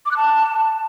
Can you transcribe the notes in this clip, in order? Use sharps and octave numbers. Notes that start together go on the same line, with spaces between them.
D6
F#6
A5